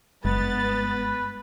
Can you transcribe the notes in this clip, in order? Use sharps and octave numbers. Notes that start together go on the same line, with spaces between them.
F#1 G2 G#3 B3 B4 A6